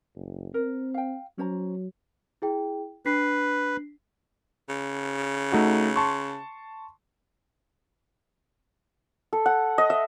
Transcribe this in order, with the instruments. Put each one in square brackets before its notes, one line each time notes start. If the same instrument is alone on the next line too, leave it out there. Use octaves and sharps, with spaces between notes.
[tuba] F#1
[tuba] C4 [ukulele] A#4
[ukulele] F5 G5
[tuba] F#3 [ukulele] C#4 C5 A#5
[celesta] E4 G#4 G5
[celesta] D4 B6 C7 [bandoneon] B4
[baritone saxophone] C#3
[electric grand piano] A3 D#4 F#4
A5 C6 C#6
[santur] A4
F#5
D#5
E5